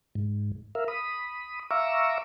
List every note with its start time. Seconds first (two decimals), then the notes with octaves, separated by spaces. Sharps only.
0.15 G#2
0.75 A#4 E5 F5
0.88 B5 D#6
1.71 E5 F5 A#5 C#6 D6 E6